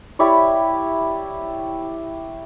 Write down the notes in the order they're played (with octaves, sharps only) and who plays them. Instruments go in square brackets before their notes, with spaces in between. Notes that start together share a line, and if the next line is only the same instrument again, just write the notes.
[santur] E4 G4 C#5 D5